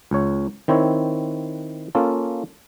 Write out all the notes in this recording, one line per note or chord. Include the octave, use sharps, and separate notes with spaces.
C#2 C#5
D#3 C4 E4 C#5
A#3 C#4 F4 A4